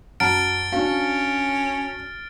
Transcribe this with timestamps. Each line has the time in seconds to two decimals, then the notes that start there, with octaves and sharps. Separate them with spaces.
0.20 F#2 F#5 A5 A#5 F6 A6 D7
0.72 C#4 D4 F#4 F5